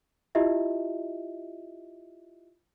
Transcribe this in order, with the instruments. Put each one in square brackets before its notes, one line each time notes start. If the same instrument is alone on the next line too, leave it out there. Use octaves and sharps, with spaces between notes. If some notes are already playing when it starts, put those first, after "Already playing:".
[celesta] E4 F4 G4 D#5 E5